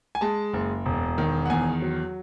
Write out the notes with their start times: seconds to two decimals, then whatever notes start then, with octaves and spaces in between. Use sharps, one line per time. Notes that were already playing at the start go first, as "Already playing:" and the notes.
0.15 G#5
0.21 G#3 A5
0.53 F#1
0.86 E1
1.18 D#3
1.46 F#5
1.50 E2 G#5
1.82 F#3